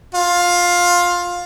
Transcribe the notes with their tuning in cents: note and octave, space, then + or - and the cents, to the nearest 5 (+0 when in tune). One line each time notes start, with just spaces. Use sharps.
F4 +15